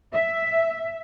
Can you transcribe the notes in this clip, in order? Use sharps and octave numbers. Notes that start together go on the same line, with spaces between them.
E5